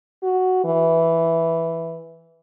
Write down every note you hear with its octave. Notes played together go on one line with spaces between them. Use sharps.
F#4
E3